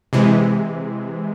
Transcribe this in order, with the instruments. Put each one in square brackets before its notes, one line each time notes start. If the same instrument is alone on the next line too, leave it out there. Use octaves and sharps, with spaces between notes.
[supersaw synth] C3 E3 G#3